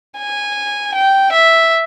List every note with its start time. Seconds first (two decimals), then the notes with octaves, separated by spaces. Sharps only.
0.18 G#5
0.95 G5
1.33 E5